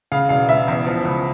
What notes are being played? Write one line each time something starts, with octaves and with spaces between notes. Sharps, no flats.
C#3 F5
E1 F5
E1 E5
E2
F3
C#2